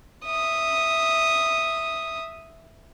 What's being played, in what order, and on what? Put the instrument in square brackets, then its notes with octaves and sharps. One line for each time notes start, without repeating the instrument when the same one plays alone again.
[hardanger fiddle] E5 D#6